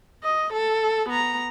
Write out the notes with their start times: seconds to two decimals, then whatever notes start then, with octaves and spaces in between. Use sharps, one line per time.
0.23 D#5
0.53 A4
1.09 B3 A#5